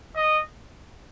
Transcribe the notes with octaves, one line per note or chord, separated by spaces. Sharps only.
D#5